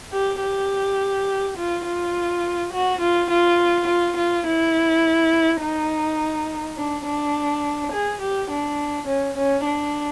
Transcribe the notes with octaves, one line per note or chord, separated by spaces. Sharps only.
G4
G4
F4
F4
F#4
F4
F4
F4
F4
E4
D#4
D4
D4
G#4
G4
D4
C#4
C#4
D4